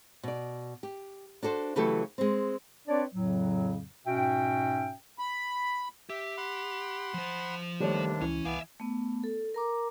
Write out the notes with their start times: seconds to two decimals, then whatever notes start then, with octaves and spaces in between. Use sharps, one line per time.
0.23 B2 D5
0.83 G4
1.43 D4 F#4 A4 C5
1.76 C#3 E3 F#3 A3 G4 A4
2.18 G#3 C4
2.88 C4 D4 B4 C#5 D5
3.13 F2 A2 C#3 F#3
4.07 G#2 B2 C#4 F#4 E5 G5
5.19 B5
6.09 G4 E5
6.37 F#5 B5 C6
7.14 F3 C5
7.80 D#2 C3 D#3 G3 A3 D4 C#5
8.21 C#2 E3 C#4
8.45 C2 B3 E5 F5 G#5 D6
8.80 A3 B3
9.24 A4
9.54 A#4 A#5 D6